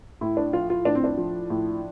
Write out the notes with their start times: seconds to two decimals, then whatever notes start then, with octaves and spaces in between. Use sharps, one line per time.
0.21 A2 E4
0.37 D4
0.53 F3 F4
0.70 F4
0.85 A2 D4
0.95 C4
1.04 D4
1.17 F3
1.50 A2